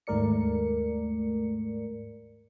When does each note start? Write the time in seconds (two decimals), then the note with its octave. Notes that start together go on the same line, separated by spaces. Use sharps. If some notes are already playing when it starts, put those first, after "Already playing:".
0.07 D#2 G#2 A3 A#4 D5 C#7